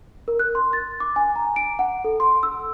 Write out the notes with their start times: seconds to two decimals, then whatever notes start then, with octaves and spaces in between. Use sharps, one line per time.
0.28 A#4
0.39 F#6
0.55 C6
0.73 A6
1.00 D6
1.16 G#5
1.35 A#5
1.56 D7
1.79 F#5
2.04 A4
2.20 C6
2.43 E6